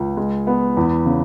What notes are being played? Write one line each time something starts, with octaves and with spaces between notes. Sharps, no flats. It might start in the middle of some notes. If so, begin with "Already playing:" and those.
Already playing: C#2
G#3
B3
E2
C#3